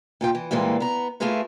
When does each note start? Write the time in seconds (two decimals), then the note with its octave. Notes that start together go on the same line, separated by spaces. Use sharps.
0.21 A#2 F4 G5
0.35 E3
0.51 A#2 E3 G3 G#3 A#3 C4
0.80 B3 A#5
1.20 A3 E4 F4 G#4 A#4 B4